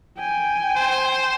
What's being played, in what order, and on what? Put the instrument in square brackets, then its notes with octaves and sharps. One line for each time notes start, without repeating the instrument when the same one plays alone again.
[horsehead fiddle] G5 G#5
[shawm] C5